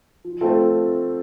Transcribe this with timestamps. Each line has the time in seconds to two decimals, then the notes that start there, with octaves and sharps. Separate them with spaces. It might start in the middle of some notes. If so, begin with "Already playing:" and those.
0.25 F3
0.41 A3 C4 F4 A4